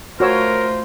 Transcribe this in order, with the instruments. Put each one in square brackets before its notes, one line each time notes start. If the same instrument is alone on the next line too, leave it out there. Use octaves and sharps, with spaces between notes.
[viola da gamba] A3 F4 [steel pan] F#4 C#5 E6 [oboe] A#4 [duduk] C5